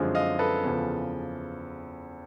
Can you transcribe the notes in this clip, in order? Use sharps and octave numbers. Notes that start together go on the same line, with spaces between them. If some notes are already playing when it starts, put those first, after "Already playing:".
Already playing: F#2 D3 F3 G#3 C4
D#5 F5
A4 B4
E2 C#3 F3